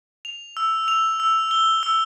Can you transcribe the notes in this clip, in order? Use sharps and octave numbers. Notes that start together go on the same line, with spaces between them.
F7
E6
F7
E6
G7
E6